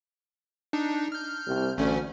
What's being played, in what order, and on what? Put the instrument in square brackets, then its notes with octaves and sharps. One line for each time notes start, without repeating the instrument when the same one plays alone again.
[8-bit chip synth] D4 D#4
F6 G6
[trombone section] C2
[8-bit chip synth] A1 A3 C#4 [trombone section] D2